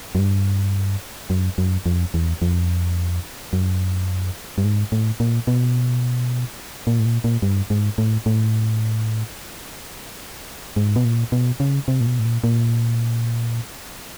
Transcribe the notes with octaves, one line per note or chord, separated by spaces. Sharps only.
F#2
G2
F#2
F#2
F2
E2
F2
F#2
G2
G#2
A2
A#2
B2
A#2
A2
A#2
A#2
G2
G#2
A2
A2
G#2
B2
A#2
B2
C#3
C3
A#2
B2
A2
A#2
A#2